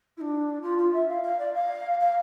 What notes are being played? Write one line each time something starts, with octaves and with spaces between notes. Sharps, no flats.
E4
D4
F4
F4
E5
F5
F5
D5
F5
F5